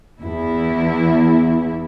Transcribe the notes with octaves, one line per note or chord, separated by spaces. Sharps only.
E2 E4